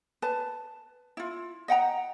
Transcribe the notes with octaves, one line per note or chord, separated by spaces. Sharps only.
B4 A5
E4 F4
D#5 F#5 G5 A#5